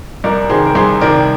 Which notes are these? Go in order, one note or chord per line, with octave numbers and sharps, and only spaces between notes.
C2 A#4 D5
C3 D#3 G#4 C5
A#4
C2 G#4 C5
C3 D#3 A#4 D5